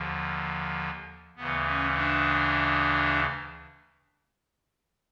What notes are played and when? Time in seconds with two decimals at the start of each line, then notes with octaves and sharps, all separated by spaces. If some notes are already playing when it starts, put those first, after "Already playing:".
Already playing: D#2 D3 F3
1.37 D2 C#3 E3 B3
1.67 C#4
1.96 D4